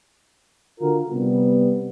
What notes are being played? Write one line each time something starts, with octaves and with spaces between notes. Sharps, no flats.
D3 F4 F#4 A#4
C3 G3 B3